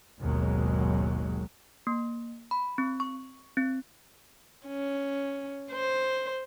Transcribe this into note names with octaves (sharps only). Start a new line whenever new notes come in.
G#1 D#2 B2 F#3 G#3
A#3
B5
C4
C#6
C4
C#4
C5